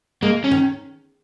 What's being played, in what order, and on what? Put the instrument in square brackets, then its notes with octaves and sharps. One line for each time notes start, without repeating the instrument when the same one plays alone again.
[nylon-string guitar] G#3 [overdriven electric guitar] A#3
[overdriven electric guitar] C#4
[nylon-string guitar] D#3